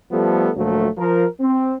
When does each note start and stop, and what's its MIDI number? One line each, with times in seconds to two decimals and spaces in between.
0.11 0.50 53
0.11 0.50 55
0.11 0.50 57
0.11 0.50 59
0.11 0.50 69
0.56 0.88 38
0.56 0.88 46
0.56 0.88 53
0.56 0.88 54
0.56 0.88 57
0.98 1.26 53
0.98 1.26 70
1.40 1.74 60